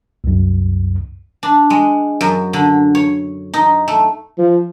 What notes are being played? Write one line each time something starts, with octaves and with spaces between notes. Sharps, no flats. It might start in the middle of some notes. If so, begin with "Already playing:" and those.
C2 F#2
D4
G#3
F#2
D3
C#5
D#4
A3
F3